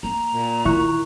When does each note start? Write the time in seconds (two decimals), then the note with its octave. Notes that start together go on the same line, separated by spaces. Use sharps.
0.03 A#3 A#5
0.34 A#2
0.65 D#3 E3 E4 C#6 F#6